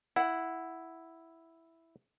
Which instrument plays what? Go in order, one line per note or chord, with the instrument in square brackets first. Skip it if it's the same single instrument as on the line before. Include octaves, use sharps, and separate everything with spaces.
[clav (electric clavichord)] E4 [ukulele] F#5